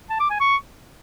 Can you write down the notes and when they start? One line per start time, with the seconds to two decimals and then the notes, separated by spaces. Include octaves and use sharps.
0.10 A5
0.20 D6
0.30 G#5
0.40 C#6